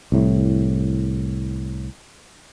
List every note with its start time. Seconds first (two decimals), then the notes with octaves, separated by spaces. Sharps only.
0.12 C2 A2